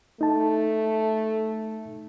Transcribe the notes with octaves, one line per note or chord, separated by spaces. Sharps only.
A3 D#4 A5